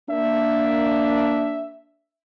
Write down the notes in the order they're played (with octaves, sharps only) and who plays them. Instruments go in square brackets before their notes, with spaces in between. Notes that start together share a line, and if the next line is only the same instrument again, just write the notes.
[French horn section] A#3 D4 [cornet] E5